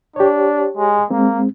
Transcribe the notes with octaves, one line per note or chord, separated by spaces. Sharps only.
D4 G4 C#5
G#3
G#3 A#3 C4